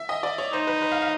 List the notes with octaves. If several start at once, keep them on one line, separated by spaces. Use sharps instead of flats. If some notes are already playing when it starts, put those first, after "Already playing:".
Already playing: E5
D#5
D5
C#5
D#4 C5
B4
B4
F5
F5